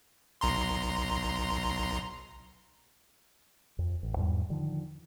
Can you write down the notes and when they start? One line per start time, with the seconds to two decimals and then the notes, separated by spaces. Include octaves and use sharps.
0.41 B1 A#5 C6
3.79 F2
4.03 A1
4.17 E2 G#2 G3
4.50 D3 D#3 F3